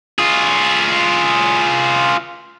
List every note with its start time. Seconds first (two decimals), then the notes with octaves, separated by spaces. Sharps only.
0.19 F4 G#4